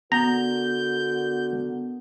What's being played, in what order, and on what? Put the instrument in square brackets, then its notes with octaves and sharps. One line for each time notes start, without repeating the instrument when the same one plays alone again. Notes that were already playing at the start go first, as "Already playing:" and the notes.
[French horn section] D3 F#4 A#4 [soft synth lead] B3 [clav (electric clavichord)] A#5 [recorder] G6